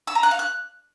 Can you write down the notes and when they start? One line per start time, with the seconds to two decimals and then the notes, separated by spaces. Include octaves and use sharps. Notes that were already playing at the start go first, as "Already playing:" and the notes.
0.07 E6
0.15 A#5
0.23 F#6
0.31 F5
0.39 F#6